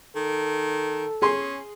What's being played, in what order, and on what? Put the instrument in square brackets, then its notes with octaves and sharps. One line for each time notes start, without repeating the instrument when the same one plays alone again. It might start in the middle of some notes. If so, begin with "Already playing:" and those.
[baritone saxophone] D#3 [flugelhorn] A4
[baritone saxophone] C#4 [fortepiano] G#4 C6